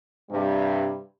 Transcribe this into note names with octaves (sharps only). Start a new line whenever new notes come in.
G2 C3 G3